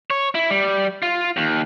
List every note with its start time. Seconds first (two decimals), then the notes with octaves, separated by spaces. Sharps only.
0.10 C#5
0.35 E4
0.50 G3
1.02 F4
1.37 D#2